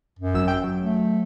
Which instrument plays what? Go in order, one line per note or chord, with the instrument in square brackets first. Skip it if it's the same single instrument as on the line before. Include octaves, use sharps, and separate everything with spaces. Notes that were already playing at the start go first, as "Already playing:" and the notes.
[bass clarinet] F#2
[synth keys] G#1 F#3 E6
G5
F#3
[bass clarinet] A3